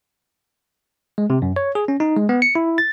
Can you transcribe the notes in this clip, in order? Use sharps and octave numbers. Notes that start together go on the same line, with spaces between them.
G#3
C3
F#2
C#5
G#4
C#4
D#4
G#3
B3
C#7
E4
A6